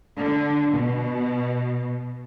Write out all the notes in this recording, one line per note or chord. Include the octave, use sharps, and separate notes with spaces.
D3
B2